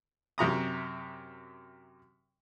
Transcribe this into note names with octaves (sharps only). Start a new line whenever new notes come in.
F#2 C3 A#5 D#6